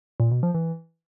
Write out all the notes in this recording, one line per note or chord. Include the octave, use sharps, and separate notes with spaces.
A#2
B2
F3
E3